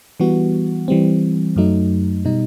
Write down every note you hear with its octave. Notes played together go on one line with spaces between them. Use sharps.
E3 G3 B3 F#4
E3 G3 C4
F#2 F#3 A3 D#4
B2 G3 D#4